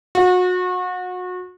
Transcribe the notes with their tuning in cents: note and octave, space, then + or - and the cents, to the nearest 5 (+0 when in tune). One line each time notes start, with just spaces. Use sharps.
F#4 -30